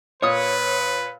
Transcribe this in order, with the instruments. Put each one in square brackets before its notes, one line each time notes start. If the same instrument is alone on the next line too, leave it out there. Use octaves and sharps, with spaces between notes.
[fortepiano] A#2 D#6 [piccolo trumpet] B4 [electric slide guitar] C#5